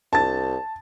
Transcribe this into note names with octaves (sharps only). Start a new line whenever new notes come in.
C2 A5 A6